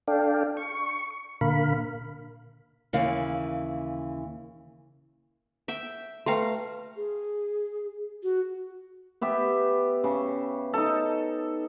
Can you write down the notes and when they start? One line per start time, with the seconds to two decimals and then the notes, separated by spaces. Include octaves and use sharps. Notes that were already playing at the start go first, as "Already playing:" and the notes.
0.08 D4 A4 D5 F5 G5
0.57 C#6
1.41 A#2 D3 A#4 F5 B5
2.93 D#2 C#3 E3 F5
5.68 E5 G5
6.26 A3 B4 F5 G5 A#5 C6
6.97 G#4
8.23 F#4
9.21 B3 G4 E5
10.04 C#3
10.73 D#4 A4